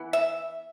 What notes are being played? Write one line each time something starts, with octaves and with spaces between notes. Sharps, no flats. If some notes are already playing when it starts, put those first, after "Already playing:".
Already playing: E3 B3
E5